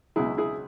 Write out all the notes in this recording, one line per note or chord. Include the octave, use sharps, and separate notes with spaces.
C#2 B2 F#3 E4 G#4
E4 G#4